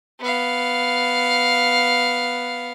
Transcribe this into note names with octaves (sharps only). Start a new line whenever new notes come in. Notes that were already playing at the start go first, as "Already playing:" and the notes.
B3 F5